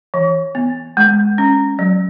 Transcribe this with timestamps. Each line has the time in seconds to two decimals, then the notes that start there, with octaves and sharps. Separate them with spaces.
0.14 E3
0.55 B3
0.97 G#3
1.38 C#4
1.79 F#3